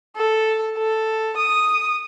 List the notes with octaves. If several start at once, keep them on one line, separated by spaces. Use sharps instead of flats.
A4
A4
D#6